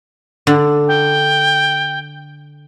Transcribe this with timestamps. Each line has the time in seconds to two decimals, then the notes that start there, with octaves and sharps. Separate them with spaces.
0.47 D3
0.88 G5